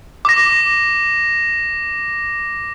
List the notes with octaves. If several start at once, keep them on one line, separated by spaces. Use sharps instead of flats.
D6 A#6